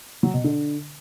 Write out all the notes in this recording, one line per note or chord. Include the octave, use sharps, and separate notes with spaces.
F#3
B2
D3